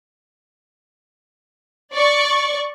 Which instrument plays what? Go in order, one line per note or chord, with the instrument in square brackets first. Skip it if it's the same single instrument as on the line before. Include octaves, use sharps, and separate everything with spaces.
[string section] D5 C#6